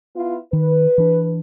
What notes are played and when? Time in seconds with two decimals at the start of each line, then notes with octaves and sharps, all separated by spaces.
0.16 B3 E4 F4
0.53 D#3 B4
0.98 E3 D4